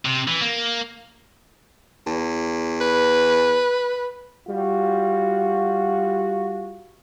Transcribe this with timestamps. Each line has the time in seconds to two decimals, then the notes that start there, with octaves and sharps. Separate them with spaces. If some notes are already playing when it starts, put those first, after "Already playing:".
0.05 C3
0.28 E3
0.41 A#3
2.06 E2
2.81 B4
4.48 G3 F4 F#4